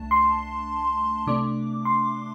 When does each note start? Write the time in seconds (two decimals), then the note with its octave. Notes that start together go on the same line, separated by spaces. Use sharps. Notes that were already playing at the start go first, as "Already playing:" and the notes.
Already playing: C2 A3 D4 A5
0.11 C6
1.27 C3 A3 D4 D6
1.85 C6